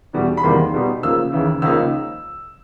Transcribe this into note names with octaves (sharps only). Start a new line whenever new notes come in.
E2 B2 G3
B5
E2 C3 D#3 G3 A#3 C6
B2 G3 B3 D#4
C#3 F3 A#3 E6
D#2 C#3 E3
C#2 C#3 F3 A#3 D#4 E6